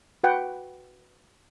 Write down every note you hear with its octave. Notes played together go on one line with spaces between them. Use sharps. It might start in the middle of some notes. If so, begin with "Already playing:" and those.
F#4 B4 F#5 G5